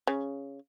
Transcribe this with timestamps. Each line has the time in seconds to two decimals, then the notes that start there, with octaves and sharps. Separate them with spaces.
0.07 C#3